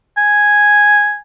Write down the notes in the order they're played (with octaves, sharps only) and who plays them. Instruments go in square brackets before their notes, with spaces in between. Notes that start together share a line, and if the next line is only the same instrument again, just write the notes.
[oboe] G#5